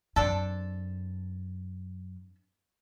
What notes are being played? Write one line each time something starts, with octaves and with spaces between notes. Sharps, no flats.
F#2 C4 D4 A4